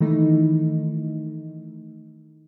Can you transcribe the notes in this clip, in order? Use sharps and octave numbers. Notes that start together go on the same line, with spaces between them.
D#3 E3 A3 D#4